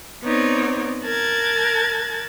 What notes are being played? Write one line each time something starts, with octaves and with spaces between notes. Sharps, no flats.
B3 C4 D#4 C#5 D5
A#4 A5 F#6 G#6 A6